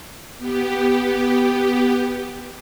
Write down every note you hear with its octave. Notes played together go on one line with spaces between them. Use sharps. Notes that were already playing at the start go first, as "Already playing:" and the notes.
B3 G4